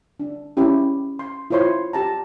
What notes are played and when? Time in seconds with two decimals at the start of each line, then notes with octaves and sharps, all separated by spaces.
0.20 D4
0.57 C#4 E4 G4
1.19 C6
1.50 E4 F4 C5 C#5 C6
1.93 G4 A5 A#5